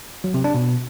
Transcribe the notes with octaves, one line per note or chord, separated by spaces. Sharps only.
F#3
C3
D4
B2